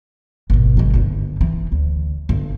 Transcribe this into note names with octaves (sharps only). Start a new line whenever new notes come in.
G#1 B2
D#3 G#3
G1 D3
E3
D2
G1